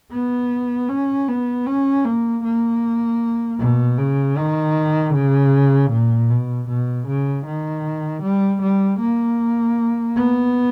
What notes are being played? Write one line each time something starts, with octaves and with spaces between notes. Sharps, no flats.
B3
C#4
B3
C#4
A#3
A#3
B2
C#3
D#3
C#3
A#2
B2
B2
C#3
D#3
G3
G3
A#3
B3